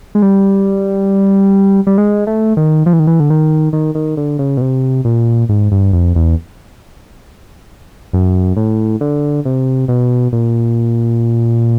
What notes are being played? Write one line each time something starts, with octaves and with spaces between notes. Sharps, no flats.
G#3
G3
G3
G#3
A3
D#3
F3
E3
D#3
E3
D3
D#3
D#3
D#3
D3
C#3
B2
C3
A#2
G#2
G2
F2
E2
F#2
A2
D3
C3
B2
A#2